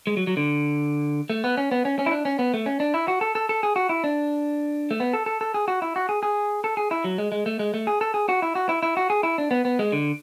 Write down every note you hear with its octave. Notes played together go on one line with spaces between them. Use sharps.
G#3
F#3
F#3
D3
A3
B3
C#4
B3
C#4
C#4
E4
D4
C#4
B3
A3
C#4
D4
E4
F#4
A4
A4
A4
G#4
F#4
E4
D4
A3
B3
A4
A4
A4
G#4
F#4
E4
F#4
G#4
G#4
A4
G#4
E4
F#3
G#3
G#3
A3
G#3
A3
G#4
A4
G#4
F#4
E4
F#4
E4
E4
F#4
G#4
E4
D4
B3
B3
G#3
D3